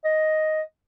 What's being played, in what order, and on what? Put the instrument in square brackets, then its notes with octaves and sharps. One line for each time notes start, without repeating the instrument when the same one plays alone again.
[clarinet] D#5